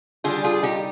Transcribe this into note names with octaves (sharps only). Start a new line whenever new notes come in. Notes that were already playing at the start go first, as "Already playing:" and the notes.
D3 G3 F4 G#4
F4 G#4
D#4 G4